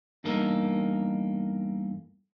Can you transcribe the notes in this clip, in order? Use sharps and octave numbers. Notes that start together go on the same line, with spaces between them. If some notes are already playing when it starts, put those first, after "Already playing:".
E2 G2 A#3 D#4 A4 A#4